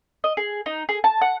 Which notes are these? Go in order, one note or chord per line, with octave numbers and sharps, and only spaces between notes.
D#5
G#4
D#4
G#4
A5
F#5